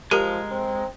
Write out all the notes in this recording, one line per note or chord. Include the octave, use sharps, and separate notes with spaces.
F3 G#3 G4 A#4
C4